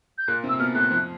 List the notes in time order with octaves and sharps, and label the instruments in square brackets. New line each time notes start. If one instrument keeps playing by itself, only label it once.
[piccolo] G6
[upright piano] A#2 A#3 [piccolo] F#6
[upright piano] C3 C4
[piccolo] E6
[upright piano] A#3
[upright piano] B2 B3 [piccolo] F6
[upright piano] A2 A3 [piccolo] F#6
[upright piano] F2 F3